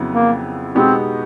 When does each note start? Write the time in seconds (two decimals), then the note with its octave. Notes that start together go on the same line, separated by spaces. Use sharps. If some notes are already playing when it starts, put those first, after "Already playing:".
Already playing: F2 C#3 F#3 B3 E4
0.12 A#3
0.75 B2 G#3 B3 C4 D#4 G4